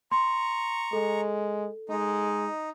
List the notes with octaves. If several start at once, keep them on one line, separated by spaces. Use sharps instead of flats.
A#5 C6 C#6
G#3 A4
G#3 D#4